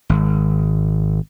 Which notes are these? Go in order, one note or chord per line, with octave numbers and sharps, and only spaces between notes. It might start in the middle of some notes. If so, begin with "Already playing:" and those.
G#1